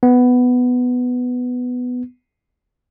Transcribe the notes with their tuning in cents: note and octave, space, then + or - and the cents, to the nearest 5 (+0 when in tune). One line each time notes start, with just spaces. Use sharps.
B3 +5